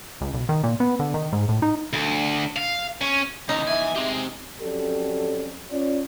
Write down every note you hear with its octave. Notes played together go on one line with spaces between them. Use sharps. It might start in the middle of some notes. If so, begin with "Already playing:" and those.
C#2
B1
D#3
A#2
B3
D3
D#3
G#2
A2
D#4
D2
F5
C#4
D#2 C#3 E3 D#4 A#5
E5 G#5
G#3 C4 G4 G#4
F2 F#3 C#4 G4 A4 D5
C#4 F4 C#5 D5